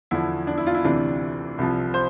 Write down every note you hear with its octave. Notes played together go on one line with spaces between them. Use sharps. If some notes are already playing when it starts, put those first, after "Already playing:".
E2 D3 F3 E4
D4
E4
F4
E4
D2 C3 E3 D4
C2 C3 F3
C5